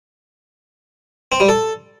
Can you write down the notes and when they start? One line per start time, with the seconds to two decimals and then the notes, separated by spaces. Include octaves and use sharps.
1.32 C4
1.40 G3
1.49 A4